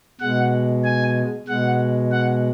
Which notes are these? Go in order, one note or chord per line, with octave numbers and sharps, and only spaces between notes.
B2 G#3 F#5
G#5
B2 G#3 F#5
F#5